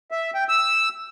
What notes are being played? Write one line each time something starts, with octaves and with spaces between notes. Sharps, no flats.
E5
G5
E6